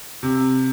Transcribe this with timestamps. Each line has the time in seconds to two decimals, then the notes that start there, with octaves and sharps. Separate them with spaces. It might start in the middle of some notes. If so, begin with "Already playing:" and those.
0.23 C3